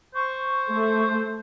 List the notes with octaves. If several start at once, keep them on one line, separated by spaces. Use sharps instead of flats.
C5 C#6
A3